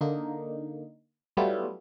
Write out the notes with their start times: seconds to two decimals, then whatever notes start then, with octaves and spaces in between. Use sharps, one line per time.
0.01 D3 A#3 D#4
1.37 F#3 G3 A3 B3 E4 F4